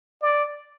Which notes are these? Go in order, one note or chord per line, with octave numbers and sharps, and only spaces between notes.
D5